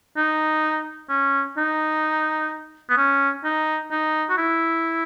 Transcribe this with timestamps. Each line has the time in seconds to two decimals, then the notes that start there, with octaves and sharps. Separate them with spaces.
0.17 D#4
1.09 C#4
1.57 D#4
2.90 B3
2.97 C#4
3.44 D#4
3.91 D#4
4.30 F#4
4.38 E4